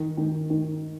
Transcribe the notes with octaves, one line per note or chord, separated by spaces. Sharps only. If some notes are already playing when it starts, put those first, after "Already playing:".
Already playing: D#3
D#3
D#3